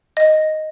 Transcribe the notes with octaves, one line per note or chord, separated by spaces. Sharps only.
D#5